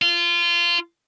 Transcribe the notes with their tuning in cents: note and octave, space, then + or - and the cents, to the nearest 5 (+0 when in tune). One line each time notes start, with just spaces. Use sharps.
F4 -20